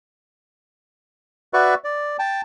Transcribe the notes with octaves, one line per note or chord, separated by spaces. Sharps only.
F#4 B4 D5 E5 C#6
D5
G5 A5